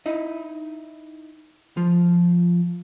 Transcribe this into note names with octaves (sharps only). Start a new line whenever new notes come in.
D#4 E4 D#5
F3 F4